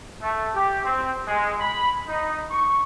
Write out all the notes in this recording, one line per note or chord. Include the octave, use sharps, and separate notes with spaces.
A3
G4
C4
G#3
B5
D#4
C#6